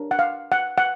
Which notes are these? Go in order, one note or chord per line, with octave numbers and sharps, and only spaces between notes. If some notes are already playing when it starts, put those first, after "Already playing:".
Already playing: D4 G4 A#4 C#5
F#5
F5
F#5
F#5